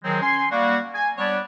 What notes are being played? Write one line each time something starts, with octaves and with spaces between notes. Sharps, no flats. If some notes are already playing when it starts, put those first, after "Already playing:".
D#3 F#3 G#3 C4
C#4 G#5 C6
G3 A#3 F#4
G#5
G3 B3 D4 C#5